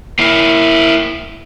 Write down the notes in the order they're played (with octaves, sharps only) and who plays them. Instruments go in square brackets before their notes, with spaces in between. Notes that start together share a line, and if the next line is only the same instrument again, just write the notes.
[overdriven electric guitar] A#3 E4